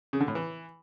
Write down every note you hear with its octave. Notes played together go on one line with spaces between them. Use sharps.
C#3
D3
A2
E3